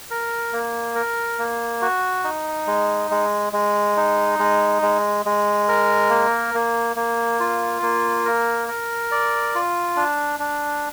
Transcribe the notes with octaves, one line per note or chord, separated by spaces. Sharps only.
A#4
A#3
A#4
A#3
F#4
D#4
G#3
G#3
G#3
D#4
G#3
G#3
G#3
A#4
A#3
A#3
A#3
F4
A#3
A#4
A#4
D5
F4
D4
D4